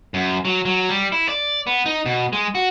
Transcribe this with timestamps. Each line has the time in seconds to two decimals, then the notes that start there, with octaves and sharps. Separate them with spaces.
0.14 F#2
0.45 F#3
0.65 F#3
0.89 G3
1.12 E4
1.29 D5
1.67 B3
1.86 D#4
2.06 B2
2.33 G#3
2.55 F#4